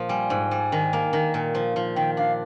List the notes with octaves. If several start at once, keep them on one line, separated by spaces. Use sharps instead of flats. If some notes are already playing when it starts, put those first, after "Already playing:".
Already playing: A#2 F3
G3 G#5
G#2
G3
D#3
A#3
D#3
A#2
F3
F3
D#3 G5
D4 F5